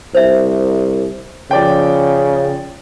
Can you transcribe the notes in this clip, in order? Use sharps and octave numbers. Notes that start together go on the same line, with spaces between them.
C2 C5 E5
C#3 F3 D5 G5